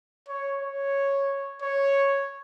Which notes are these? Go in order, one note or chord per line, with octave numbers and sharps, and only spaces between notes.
C#5
C#5
C#5